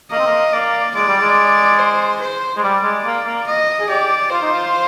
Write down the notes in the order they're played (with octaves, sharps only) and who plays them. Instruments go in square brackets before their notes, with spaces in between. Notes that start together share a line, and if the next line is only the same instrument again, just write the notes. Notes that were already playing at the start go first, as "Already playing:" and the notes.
[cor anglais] A#3 [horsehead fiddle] D#5
[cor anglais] C4
A#3
[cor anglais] A#3 [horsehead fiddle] D5
[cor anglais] G#3 [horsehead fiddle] D5
[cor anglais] G3
G#3
[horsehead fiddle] C5
C5
[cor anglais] G#3
[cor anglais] G3 [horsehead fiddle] D5
[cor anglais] G#3
A#3
A#3
[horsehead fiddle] D#5
[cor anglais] G#4
[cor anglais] G4 [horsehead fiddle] D5
[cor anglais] F4 [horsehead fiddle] C5
[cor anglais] D#4
F4